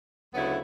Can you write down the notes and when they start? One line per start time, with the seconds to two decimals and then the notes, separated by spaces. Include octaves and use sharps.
0.33 D2 C#3 F#3 B3 E4